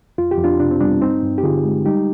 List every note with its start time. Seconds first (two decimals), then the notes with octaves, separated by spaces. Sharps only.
0.18 F2 F4
0.31 G4
0.38 F2
0.44 D4 F4
0.60 C3 D4
0.71 C4
0.81 G3 B3 D4
1.01 G2 C4 D#4
1.23 G2
1.38 G4
1.43 D3 F4 G#4
1.65 G#3
1.85 G3 D#4 G4